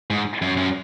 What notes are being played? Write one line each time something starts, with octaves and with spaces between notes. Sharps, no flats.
G#2
F#2
F#2